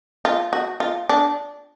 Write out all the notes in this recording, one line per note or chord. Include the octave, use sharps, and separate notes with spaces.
F4
F#4
F4
D4